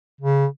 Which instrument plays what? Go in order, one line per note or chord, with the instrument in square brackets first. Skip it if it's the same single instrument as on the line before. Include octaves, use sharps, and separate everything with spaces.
[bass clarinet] C#3